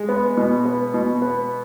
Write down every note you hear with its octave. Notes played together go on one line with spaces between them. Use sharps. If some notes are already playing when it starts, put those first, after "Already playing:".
Already playing: G#3
B3
B2
B3
B2
B3